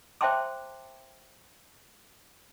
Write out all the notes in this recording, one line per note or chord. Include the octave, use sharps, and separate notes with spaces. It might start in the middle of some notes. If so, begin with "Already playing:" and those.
C5 E5 G5 A5 C6 D6